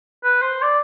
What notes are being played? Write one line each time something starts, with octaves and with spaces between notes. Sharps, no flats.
B4
C5
D5